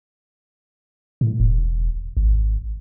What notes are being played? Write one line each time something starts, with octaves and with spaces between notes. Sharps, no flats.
A2
E1
G#1